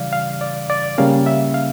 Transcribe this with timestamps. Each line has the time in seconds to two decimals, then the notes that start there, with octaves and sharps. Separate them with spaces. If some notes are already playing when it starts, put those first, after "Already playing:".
Already playing: C#3 E3 G3 D5 F5
0.13 F5
0.41 D5
0.70 D5
0.98 C#3 G3 A#3 C#4 F5
1.26 E5
1.54 F5